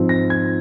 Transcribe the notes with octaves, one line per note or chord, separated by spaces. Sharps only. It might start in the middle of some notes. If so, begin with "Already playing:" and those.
Already playing: G#2 F3 C4
A#6
G#6